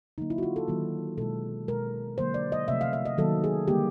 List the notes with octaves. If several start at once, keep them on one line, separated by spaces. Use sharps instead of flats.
D3 F#3 A#3 D#4
E4
F#4
F4
A4
D#3 F#3 A#3
B2 G#3 A4
B2 G#3 A#4
D3 F#3 A#3 C5
D5
D#5
C3 F3 A3 E5
F5
E5
D#5
D#3 F#3 A#3 A4
G#4
D3 G3 A#3 G4